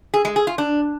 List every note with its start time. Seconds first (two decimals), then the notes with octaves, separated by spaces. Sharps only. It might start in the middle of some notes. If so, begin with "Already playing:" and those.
0.14 G#4
0.25 G#3
0.36 G#4
0.47 F4
0.58 D4